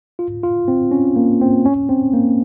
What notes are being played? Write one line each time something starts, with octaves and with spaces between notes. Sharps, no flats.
F4
F4
C4
C#4
A#3
C4
C#4
C4
A#3